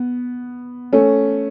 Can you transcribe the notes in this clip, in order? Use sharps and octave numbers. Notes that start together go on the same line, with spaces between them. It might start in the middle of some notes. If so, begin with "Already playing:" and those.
Already playing: B3
A3 C#4